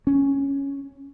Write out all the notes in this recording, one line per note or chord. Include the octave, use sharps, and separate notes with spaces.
C#4